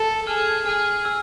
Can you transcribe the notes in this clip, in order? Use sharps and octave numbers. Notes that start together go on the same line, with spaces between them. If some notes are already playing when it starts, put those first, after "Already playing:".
Already playing: A4
G#4 F6
G#4 F6
E6